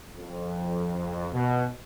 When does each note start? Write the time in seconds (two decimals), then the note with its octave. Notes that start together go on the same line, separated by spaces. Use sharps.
0.17 F2
1.34 B2